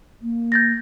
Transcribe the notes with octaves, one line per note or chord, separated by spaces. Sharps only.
A#3
G6 A6 A#6